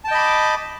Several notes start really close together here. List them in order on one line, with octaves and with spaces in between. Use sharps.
A5 G5 D#5 B5 D6